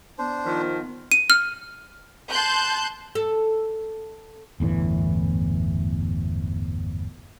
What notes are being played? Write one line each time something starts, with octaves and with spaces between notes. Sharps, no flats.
B3 D4 C5
D#3 F3
D#7
F6
A5 C6 F#6 G6
A4
G1 E2 A2 E3